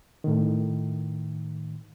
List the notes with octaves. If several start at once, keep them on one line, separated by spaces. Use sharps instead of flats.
A2 D#3